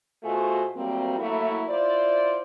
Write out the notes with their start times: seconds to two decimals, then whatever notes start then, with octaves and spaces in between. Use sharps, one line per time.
0.23 B2 A3 F4 F#4 G#4 C5
0.76 A2 F#3 G3 A#3 C4
1.18 F#3 A3 A#3 E4
1.68 E4 F4 C5 D5